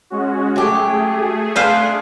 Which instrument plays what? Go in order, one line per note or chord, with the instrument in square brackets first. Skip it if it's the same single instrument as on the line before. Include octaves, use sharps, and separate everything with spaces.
[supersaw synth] G#3 C#4 F#4
[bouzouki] F#3 G4 [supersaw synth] A3 G#4
[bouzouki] D4 [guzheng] B4 C5 F5